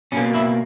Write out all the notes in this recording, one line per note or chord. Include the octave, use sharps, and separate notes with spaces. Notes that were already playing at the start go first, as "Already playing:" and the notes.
B2 A#3 C#4
E4